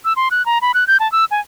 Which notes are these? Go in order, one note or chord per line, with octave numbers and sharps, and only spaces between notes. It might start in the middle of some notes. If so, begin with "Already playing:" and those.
E6
C6
F#6
A#5
B5
F#6
G6
A5
E6
G#5